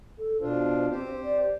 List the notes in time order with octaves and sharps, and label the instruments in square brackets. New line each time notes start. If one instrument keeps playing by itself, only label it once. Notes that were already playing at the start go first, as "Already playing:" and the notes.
[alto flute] A4
[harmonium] B2 D4 F4 [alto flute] C5
[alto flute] C4 [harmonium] G4 C5
[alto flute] D5